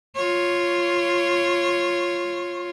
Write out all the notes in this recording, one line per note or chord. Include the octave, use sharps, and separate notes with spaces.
F4 C#5